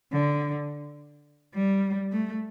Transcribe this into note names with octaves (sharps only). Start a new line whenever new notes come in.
D3
G3
A3